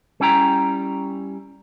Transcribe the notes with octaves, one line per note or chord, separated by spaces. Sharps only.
G3 C#4 E4 G5 A#5